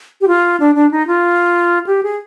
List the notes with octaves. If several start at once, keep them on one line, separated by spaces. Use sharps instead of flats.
G4
F4
D4
D4
D#4
F4
G4
G#4